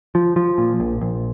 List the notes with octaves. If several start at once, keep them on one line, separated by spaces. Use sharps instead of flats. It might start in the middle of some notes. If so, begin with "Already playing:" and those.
F3
F3
A#2
A#1
A#1